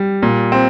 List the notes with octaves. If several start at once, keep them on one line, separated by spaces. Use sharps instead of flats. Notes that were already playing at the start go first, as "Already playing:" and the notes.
Already playing: G3
A#2
C4